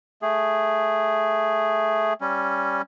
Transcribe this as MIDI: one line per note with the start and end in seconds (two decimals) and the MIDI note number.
0.22 2.13 57
0.22 2.13 68
2.21 2.82 55
2.21 2.82 61